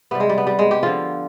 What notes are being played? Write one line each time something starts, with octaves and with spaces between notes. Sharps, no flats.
C3 G3 B3
G#3
G3
B3
G3
G#3
G4
D3 F3 F4